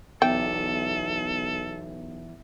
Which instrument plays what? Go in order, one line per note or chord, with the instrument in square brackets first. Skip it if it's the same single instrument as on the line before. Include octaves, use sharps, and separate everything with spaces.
[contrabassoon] B1 [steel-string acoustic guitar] E2 [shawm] A4 [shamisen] G5